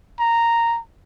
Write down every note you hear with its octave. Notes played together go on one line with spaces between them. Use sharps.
A#5